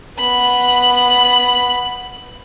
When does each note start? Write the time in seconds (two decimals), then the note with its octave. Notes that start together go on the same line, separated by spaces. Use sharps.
0.18 B3 B5